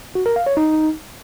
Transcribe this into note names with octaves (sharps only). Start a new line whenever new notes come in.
F#4
A#4
F5
C#5
D#4